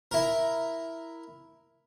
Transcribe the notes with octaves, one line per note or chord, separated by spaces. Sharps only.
E4 A#4